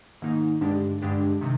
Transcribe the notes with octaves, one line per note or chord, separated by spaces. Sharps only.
G#2 D#3 A#3 D#4
G2 D3 G#3 D4 G4
G2 D3 G#3 D4 G4
C3 D#3